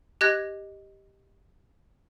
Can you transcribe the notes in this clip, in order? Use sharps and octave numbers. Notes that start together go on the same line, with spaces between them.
G4 D#5 F#6 G#6 A#6